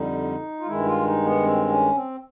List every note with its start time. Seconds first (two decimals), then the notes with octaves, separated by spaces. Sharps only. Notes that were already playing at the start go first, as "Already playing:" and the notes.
Already playing: F2 D3 G3 D#4
0.60 F4
0.66 G2 D#3 G#3 E4
0.85 F4
1.05 D#4
1.24 B3
1.43 C4
1.69 C#4
1.95 C4